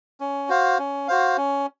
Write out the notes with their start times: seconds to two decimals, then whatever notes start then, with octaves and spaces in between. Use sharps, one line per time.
0.20 C#4
0.49 F#4 C5 F5
0.79 C#4
1.08 F#4 C5 F5
1.37 C#4